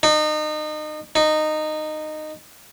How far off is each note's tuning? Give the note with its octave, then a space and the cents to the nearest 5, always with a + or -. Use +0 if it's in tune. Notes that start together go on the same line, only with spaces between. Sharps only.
D#4 -30
D#4 -15